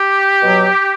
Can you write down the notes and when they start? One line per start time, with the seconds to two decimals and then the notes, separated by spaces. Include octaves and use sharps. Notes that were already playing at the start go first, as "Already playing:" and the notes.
Already playing: G4
0.40 B2 F#3